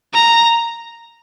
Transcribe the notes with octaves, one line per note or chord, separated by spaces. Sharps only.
A#5